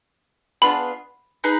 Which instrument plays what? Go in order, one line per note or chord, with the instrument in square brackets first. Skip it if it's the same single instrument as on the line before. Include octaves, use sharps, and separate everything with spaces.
[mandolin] B3 D4 F4 G#4 [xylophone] B5
[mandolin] D#4 G#4 B4